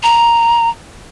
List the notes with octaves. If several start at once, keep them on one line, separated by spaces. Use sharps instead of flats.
A#5